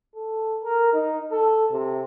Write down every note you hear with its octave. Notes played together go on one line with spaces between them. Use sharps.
A4
A#4
D#4
A4
C3